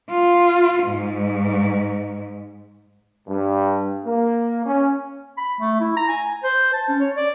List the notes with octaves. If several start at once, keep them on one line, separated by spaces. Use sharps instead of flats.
F4
G#2
G2
A#3
C#4
B5
A3
E4
A#5
G#5
C5
A5
C#4
C#5
D5